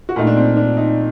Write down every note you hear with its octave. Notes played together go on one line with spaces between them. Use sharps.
F#4
A#2 A3 D#4
D4
C4
D4
D#4